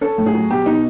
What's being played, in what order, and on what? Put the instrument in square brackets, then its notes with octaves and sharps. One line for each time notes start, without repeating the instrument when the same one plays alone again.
[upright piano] C#4 A4
A2
G#4
F#3
B2 G4
B2 D#4